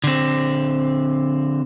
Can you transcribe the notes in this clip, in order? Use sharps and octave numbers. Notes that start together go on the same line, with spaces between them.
D3 C4